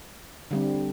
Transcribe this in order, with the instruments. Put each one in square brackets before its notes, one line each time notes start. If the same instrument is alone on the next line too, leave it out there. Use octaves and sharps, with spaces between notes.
[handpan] D3 G3 C4